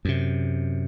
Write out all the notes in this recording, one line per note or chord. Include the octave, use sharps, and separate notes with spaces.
F#2 C3